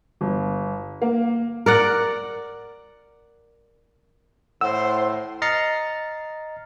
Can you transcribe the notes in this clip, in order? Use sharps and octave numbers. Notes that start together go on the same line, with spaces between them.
G1
A#3
A#4 D5 F#5
A2 C5 F#5 E6
D#5 A#5 F6 A6 C7 C#7